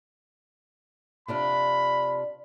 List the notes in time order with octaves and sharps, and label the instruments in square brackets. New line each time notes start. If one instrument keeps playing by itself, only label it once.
[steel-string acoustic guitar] C3 D4 F4 [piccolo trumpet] B5